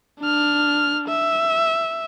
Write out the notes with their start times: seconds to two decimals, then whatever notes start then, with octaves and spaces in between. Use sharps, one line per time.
0.20 D4 F6
1.08 E5